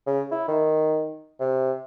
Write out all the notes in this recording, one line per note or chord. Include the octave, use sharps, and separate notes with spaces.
C#3
E4
D#3
C3